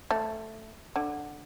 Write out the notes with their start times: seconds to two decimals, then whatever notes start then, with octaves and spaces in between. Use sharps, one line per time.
0.11 A3
0.96 D3